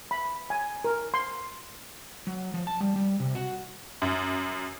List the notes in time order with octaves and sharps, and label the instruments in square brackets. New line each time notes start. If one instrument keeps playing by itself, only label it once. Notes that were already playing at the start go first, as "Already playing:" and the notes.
[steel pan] B5
G#5
A#4
C6
[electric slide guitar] F#3
F3
A5
G3
G3
C3
F#4
[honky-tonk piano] F#2